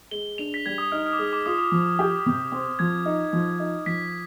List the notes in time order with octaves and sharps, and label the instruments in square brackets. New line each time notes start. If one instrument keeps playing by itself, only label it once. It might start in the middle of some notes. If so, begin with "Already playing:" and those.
[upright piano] G#3 [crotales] G7
[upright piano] D4 [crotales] F7
[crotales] B6
[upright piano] G3 [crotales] G#6
[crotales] D#6
[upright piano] D#4 [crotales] F6
[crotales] F6
D6
[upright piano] G#3 [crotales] D#6
[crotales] D6
[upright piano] F4 [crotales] D#6
[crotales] D#6
[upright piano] F3
G4
C3
C4
[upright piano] F3 [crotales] G#6
[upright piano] D#4
F3
D#4
[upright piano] F3 [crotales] B6